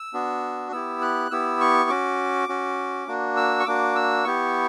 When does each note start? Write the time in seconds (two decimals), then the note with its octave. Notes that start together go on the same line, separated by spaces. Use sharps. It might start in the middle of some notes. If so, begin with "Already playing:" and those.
Already playing: E6
0.13 B3 D4 F#4
0.72 B3 E4 G4 E6
1.02 F#6
1.31 B3 E4 G4 E6
1.60 C#6
1.90 C#4 F#4 D6
2.49 C#4 F#4
3.07 A#3 D4 F#4
3.37 E6
3.60 C#6
3.66 A#3 D4 F#4 D6
3.96 E6
4.24 B3 E4 G4 C#6